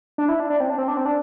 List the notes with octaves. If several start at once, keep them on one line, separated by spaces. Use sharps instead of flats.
D4
E4
D4
D4
C4
D4
C4
D4
C4
D4